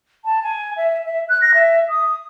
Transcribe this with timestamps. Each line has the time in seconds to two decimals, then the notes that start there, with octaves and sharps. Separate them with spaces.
0.24 A5
0.42 G#5
0.76 E5
1.04 E5
1.28 F#6
1.41 A#6
1.54 E5
1.89 D#6